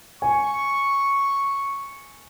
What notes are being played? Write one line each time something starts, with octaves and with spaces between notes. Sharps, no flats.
G#5 C#6